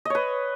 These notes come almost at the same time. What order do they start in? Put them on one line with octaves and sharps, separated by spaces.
D#5 C#5 B4